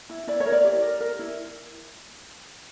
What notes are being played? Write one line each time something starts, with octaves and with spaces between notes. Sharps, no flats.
E4
E4 D5
C#5
A#4
D5
G4
A#4
A#4
E4